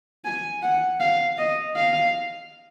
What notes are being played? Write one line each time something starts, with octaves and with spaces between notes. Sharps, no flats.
G#5
F#5
F5
D#5
F5